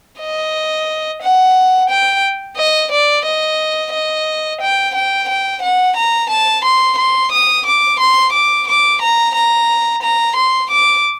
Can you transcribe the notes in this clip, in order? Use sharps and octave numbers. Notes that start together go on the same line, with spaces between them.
D#5
F#5
G5
D#5
D5
D#5
D#5
G5
G5
G5
F#5
A#5
A5
C6
C6
D#6
D6
C6
D6
D6
A#5
A#5
A#5
C6
D6